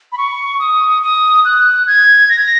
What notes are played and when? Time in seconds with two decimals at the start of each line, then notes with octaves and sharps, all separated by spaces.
0.12 B5
0.18 C#6
0.60 D#6
1.02 D#6
1.45 F#6
1.87 G#6
2.29 A#6